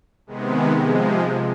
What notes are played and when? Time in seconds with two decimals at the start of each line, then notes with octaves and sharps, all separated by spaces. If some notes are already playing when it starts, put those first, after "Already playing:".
0.27 C3 D#3 G#3 B3
0.78 C3 F3 G#3